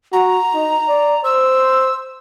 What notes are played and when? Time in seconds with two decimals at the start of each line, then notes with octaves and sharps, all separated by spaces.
0.13 F#4 A#5
0.54 D#4
0.88 D5
1.24 C5 E6